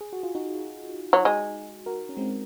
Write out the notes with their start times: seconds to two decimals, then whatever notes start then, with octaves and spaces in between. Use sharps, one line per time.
0.01 G#4
0.13 F#4
0.23 F4
0.35 D#4 F#4
1.13 F#3
1.25 G#3
1.86 F#4 A#4
2.09 C#4
2.17 G#3 C4